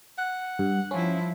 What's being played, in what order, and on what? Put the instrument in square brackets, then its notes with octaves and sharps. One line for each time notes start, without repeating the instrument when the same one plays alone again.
[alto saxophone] F#5
[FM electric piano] G2
[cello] F3 E4 [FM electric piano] C#4